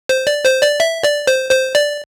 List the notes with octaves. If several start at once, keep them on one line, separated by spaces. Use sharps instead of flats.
C5
D5
C5
D5
E5
D5
C5
C5
D5